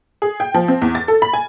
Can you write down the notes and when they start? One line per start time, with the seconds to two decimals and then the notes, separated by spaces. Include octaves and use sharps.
0.22 G#4
0.40 G5
0.54 F3
0.68 C4
0.82 E2
0.95 A6
1.08 A4
1.22 B5
1.33 G#5